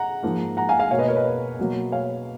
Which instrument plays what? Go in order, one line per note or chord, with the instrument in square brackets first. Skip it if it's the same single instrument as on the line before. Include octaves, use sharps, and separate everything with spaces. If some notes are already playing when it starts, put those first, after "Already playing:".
Already playing: [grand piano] F#5 A#5
G#2 F3 A#3
F#5 A#5
F5 G#5
F5 G#5
B2 A#3 C#5 F5
B4 D#5
A#4 C#5
B4 D#5
B2 F#3 A#3
C#5 F5